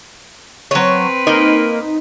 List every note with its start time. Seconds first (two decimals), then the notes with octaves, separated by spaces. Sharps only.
0.71 F#3 C4 B4 C#5
1.27 A#3 D#4